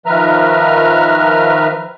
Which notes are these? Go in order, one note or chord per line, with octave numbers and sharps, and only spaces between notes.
D#3 F3 B4 E5 A#5 F6